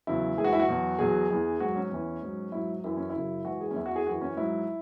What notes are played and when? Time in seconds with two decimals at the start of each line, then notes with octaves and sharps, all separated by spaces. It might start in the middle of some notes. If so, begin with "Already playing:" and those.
0.07 E2 C#3 F#3 E4
0.37 G#2 E3 G#4
0.44 F#4
0.53 E4
0.60 F#4
0.69 E2 B2 F#3
0.99 E2 B2 F#3 G#4
1.30 E2 E3
1.60 G#2 F#3 F#4
1.76 C#4
1.91 E2 E3
2.22 G#2 F#3
2.52 G#2 F#3 E4
2.84 F#2 E3 E4
2.97 C#4
3.09 E4
3.15 F#2 C#3 F#3
3.44 G#2 E3 F#4
3.61 G#4
3.71 C#4
3.76 E2 E3 E4
3.86 F#4
3.96 G#4
4.07 F#2 E3 F#4
4.21 C#4
4.37 G#2 F#3 E4